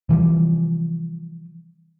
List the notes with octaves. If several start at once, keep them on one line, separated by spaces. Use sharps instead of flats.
C3 E3 F3 G3